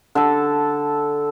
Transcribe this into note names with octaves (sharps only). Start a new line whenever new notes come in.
D3 A4